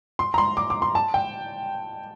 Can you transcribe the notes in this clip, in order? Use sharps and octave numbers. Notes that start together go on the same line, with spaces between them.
C6
A#5
C6
D6
D6
C6
A5
G5